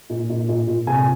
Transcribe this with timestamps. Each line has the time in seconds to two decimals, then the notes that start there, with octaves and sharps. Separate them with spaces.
0.10 A#2
0.29 A#2
0.49 A#2
0.67 A#2
0.87 C3 G#5